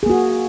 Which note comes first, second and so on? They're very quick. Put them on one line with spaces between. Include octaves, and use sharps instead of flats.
G#4 A#3 F#4